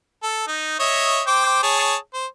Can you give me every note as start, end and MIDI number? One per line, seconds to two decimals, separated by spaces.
0.23 0.45 69
0.48 0.76 63
0.79 1.22 73
0.79 1.22 75
0.79 1.22 76
1.27 1.62 72
1.27 1.62 79
1.27 1.62 86
1.63 1.95 68
1.63 1.95 73
1.63 1.95 81
2.14 2.26 72